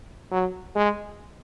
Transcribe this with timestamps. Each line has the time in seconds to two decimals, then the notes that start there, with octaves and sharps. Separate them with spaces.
0.31 F#3
0.76 G#3